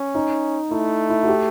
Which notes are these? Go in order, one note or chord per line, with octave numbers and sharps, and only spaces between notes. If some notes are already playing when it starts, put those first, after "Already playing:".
Already playing: C#4
D#4
A3 E4
E4
F#4
G4